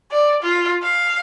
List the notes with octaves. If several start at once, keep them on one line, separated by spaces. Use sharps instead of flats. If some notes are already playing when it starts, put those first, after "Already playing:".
D5
F4
F5